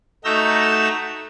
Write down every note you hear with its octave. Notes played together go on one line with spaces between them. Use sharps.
A3 D#4 F#4 A#5 E6 G6